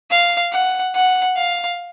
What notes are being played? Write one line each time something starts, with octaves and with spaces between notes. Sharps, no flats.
F5
F#5
F#5
F5